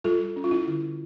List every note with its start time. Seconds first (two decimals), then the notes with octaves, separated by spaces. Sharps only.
0.04 G3 F4 A4
0.36 C#4
0.44 F4
0.51 E4
0.67 D3